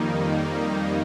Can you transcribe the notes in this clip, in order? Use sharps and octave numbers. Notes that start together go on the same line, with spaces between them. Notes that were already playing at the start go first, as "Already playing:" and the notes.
Already playing: F2 D#3 G3 A#3 D#4